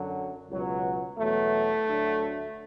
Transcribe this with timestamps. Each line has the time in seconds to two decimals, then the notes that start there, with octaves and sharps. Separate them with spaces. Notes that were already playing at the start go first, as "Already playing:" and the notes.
Already playing: F#2 D3 F#3
0.50 C#2 B2 F#3
1.18 E2 B2 F#3 A3
1.87 D2 D3 F#3